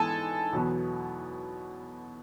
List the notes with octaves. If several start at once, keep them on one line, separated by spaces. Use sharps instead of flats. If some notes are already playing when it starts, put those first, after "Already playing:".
Already playing: G#2 E3 G#3 B3 A4 G#5 A5
E2 B2 F#3 B3